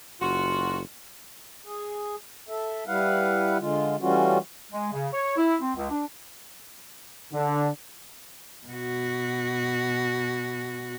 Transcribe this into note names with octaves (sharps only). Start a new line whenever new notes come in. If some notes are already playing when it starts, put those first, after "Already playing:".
F#1 F4 F#4
G#4
A4 E5
G3 E4 B4 F5 F#5
D3 G#3 F4
E3 G3 A3 C#4 F4 F#4
G#3
C#3
C#5
E4
C4
C#2
D4
D3
B2 F#4